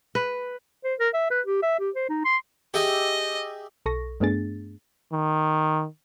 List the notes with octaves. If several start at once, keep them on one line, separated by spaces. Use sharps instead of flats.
B4
C5
A#4
E5
B4
G4
E5
G4
C5
D#4
C6
G4 G#4 D#5 E5
B1 A4 C#6 A#6
G2 A3 B3 D4 G#4 A6
D#3